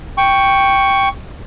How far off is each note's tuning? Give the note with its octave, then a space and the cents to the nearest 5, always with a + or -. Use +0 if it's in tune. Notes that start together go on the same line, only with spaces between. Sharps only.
G5 +0 C#6 +5